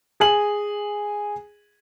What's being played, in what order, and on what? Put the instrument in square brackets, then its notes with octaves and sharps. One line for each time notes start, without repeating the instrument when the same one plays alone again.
[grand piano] G#4 G#5 F#7